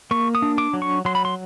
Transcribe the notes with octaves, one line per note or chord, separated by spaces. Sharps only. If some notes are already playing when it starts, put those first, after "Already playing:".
A#3 C#6
D#6
D4
D6
F#3
C#6
F#3 C6
B5
C6